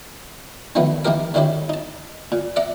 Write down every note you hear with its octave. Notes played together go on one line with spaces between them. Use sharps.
D3 D#3 F3 A3 B3
E3 A#3 D#4 G4 A#4
D3 D#3 C#4 E4 G4
D#4 A5
A#2
D5 E5 F#5 A#5